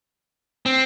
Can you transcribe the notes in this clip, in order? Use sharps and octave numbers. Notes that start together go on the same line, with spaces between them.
C4